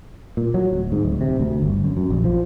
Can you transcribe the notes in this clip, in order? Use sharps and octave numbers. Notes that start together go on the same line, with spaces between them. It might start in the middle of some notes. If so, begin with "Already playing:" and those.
A#2
F#3
D1
G#2
D1
C3
D2
G1
F#2
F#2
A#1
F3